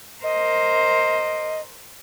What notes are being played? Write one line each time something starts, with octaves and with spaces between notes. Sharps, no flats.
A#4 C5 D#5